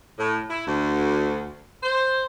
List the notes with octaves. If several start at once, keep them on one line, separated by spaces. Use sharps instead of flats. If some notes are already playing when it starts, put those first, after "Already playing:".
A2
E4
D2
C5